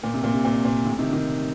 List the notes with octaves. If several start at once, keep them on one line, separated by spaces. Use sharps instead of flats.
A#2
C3
A#2
C3
A#2
C3
A#2
A2 C3
C3 D#3
C3 D#3